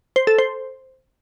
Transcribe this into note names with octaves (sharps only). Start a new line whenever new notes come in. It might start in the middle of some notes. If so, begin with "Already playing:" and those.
C5
A4
C5